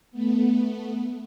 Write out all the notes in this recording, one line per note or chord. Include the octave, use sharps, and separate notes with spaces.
A3 B3